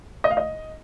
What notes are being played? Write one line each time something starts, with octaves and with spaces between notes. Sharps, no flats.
D#5
F5
D#5